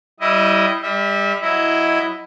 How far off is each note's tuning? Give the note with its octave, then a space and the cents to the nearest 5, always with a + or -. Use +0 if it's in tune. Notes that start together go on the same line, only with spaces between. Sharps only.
G3 -20 E4 +0 D#5 +0
G3 +30 E5 -25
F#3 +0 E4 +0 D#5 +0